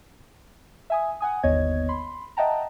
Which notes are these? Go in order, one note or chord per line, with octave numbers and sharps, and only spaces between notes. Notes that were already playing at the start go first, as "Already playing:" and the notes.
E5 G#5 D#6
F#5 G#5 D#6
G1 D#2 B3 C#5 D#5 G#6
B5 C6
D#5 E5 F#5 G5 A5 A#5